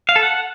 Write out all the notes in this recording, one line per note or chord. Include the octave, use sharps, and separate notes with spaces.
F5
A4
F#5